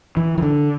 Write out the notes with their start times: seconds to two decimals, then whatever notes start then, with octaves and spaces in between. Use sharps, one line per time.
0.17 E3
0.38 E3
0.42 D3